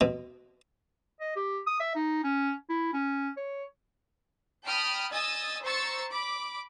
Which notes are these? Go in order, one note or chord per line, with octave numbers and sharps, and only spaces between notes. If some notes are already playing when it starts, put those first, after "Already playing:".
B2
D#5
G4
D#6
E5
D#4
C#4
E4
C#4
C#5
G5 A5 B5 D#6 F6
D#5 G#5 D#6 E6 A6
C5 A#5 C#6 E6 A6 C#7
B5 D6